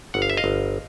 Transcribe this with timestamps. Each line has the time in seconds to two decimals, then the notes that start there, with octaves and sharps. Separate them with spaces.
0.14 G1 F#5
0.22 F5
0.30 E5
0.37 D#5 F5
0.44 G1